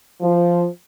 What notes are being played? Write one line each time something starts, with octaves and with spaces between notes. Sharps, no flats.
F3